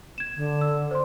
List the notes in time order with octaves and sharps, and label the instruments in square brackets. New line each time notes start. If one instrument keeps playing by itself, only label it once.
[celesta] G#6 E7
[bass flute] D3
[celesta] E6
C5 D5 C6